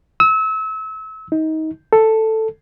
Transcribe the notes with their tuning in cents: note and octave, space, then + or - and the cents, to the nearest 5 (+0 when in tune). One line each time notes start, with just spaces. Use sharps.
E6 -30
D#4 +25
A4 +5